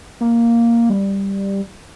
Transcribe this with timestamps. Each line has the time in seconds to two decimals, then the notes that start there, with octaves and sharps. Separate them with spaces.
0.21 A#3
0.89 G3